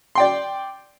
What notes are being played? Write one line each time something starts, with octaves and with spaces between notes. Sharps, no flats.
D5 G5 C6